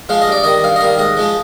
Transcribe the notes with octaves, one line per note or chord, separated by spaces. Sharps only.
F3 G#3 F5
D#5
G2 D5
D#3 G3 D#5
G2 F5
D#5
D#3 G3 F5
G#2 D#5
F3 G#3